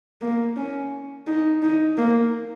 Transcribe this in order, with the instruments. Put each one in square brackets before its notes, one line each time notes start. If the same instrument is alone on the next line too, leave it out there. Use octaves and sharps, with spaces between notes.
[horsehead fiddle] A#3
C#4
D#4
D#4
A#3